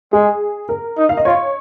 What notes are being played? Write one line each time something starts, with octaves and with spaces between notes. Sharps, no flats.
G#3 G#4
A#4
D#4
F5
D#5
F4 C#5